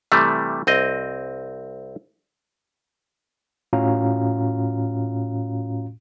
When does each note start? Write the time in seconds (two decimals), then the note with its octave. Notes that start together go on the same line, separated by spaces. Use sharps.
0.12 C3 E3 G3 A3
0.67 C2 C4 D#5
3.73 A2 C#4 F4 F#4 F5 A#5